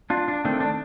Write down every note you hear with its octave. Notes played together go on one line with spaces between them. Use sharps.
D4 F4
D4
D#3 A3 C4 D4
D4